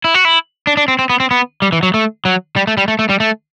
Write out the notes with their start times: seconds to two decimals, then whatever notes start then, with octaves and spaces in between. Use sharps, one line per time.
0.04 E4
0.14 F#4
0.25 E4
0.67 D4
0.77 D4
0.88 C4
0.99 C4
1.10 B3
1.20 C4
1.31 B3
1.62 G3
1.72 E3
1.83 F#3
1.94 A3
2.25 F#3
2.56 G3
2.67 A3
2.77 G3
2.88 A3
2.99 A3
3.09 G3
3.20 A3